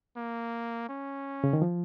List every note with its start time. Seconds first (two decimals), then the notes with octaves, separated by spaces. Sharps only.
0.16 A#3
0.89 C#4
1.44 C#3
1.53 D#3
1.62 F3